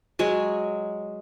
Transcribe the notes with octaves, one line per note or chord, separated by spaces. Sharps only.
F#3 G#3 C#5